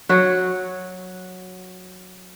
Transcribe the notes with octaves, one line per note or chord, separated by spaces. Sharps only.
F#3 F#4